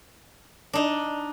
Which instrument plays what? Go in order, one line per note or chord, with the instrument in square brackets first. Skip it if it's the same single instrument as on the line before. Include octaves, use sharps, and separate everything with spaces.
[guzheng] D4 D#4